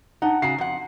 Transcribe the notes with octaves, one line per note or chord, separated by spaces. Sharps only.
D#4 F#5 A5
C#3 F#4 A#5 C7
F2 F#5